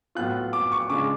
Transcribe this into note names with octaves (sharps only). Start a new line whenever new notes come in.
A2 F#3 B3 F4 F#6
D6
C#6
C#3 G#3 D4 F4 D6